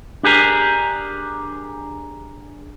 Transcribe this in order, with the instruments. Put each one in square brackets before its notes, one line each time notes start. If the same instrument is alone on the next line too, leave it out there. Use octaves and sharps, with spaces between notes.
[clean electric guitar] D4 G4 G#4 A#4